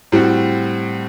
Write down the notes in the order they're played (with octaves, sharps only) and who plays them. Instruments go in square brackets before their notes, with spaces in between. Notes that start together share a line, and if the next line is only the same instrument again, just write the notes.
[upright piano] A2 G3 C4 F#4